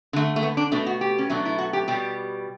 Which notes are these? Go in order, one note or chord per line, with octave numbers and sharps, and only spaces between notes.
D3 A3
A3
B3
D4
B2 A3 D4
F#4
G4
C#4
B2 F#3 A3 D4
E4
F#4
G4
B2 G3 G4